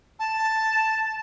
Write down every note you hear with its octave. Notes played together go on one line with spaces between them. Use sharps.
A5